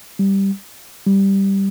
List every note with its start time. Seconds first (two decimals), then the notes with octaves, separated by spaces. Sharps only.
0.19 G3
1.07 G3